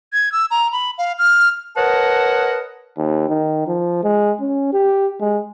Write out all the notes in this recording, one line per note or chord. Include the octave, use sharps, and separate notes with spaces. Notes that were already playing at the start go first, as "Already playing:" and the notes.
G#6
E6
A#5
B5
F5
F6
A#4 B4 C#5 D#5 F#5 A5
D#2
D#3
F3
G#3
C#4
G4
G#3